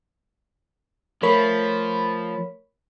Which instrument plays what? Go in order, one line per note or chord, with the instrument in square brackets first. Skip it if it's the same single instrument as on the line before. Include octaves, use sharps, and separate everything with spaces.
[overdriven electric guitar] F3 [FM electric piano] A3 C#5 B5 [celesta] A#4